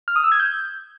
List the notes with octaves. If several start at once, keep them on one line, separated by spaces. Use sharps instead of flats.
F6
D#6
E6
G#6
G6